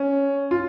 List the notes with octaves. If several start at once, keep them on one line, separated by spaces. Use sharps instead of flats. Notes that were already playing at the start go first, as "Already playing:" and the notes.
Already playing: C#4
F4